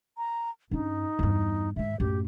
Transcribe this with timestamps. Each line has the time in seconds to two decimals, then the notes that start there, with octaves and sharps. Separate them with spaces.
0.18 A#5
0.71 G2 C#4 D#4
1.19 E2 G2
1.76 G#2 D#3 E5
2.00 F#2 A2 G4